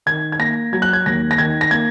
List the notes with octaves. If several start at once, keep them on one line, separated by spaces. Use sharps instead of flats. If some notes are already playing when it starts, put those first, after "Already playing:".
D#3 G#6
G#6
A#3 A#6
F#3 G#6
F#6
G#6
D#2 A#6
A#6
D#3 G#6
A#6
A#3 G#6